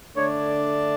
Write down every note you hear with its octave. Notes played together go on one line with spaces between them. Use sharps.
D3 A3 D4 C#5
D5